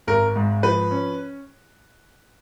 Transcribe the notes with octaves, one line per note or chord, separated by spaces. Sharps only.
G#1 A#4
G#2
F3 B4
C#4